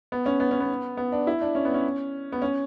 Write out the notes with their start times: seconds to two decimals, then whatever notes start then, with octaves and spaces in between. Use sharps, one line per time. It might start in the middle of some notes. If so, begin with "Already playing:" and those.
0.12 B3
0.26 C#4
0.40 B3
0.51 C#4
0.60 B3
0.97 B3
1.12 D4
1.27 E4
1.41 D4
1.55 C#4
1.65 B3
1.74 C#4
2.32 B3
2.42 C#4